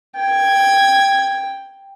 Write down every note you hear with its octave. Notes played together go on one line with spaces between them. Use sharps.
G5 G#6